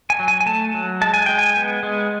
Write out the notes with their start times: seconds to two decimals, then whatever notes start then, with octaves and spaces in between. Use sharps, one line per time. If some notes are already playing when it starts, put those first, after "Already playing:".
0.10 G#5
0.20 F#3
0.28 G#5
0.40 G#5
0.46 A3 A5
0.74 F#3
1.01 G#3 A5
1.14 G#5
1.26 G#3 G5
1.38 G#5
1.56 B3
1.83 G#3